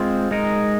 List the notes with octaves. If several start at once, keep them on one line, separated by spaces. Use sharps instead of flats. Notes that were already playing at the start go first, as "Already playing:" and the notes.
Already playing: G#3 C4 F4 C5
G#3 D#4 A#4